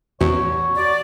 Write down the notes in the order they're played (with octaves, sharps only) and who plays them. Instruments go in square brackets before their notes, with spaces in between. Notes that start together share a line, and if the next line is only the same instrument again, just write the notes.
[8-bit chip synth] E2 [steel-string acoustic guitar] F#4 [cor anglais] C#5
[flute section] D5